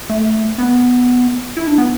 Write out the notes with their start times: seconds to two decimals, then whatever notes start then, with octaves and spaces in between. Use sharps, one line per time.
0.10 A3
0.58 B3
1.57 E4
1.67 D4
1.78 B3